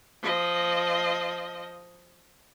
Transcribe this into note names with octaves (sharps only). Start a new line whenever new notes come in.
F3 D#5